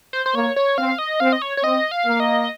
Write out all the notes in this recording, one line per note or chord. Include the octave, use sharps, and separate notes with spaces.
C5
C5
A#3 C#5
C#5
C4 F5
D#5
C4 F5
D#5
C#5
C#5
C4 D#5
F5
A#3
D#5